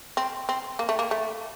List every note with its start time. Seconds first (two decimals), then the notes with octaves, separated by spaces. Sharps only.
0.17 C4
0.49 C4
0.79 A#3
0.89 A3
0.99 A#3
1.11 A3